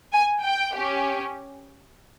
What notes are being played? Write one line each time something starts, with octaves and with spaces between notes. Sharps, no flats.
G#5
G5
C#4 G4